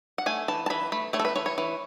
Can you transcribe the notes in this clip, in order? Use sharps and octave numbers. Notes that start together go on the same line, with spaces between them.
F#5
A3 G#5
E3 A5
A5
E3 B5
A3 B5
A3 C#5
A4
B4
E3 C#5
C#5
E3